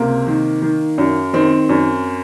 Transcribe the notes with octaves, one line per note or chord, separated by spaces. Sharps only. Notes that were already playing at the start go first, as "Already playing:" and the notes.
Already playing: C#2 C3 A#3
D#3
D#3
F#2
D#3 C4
F#2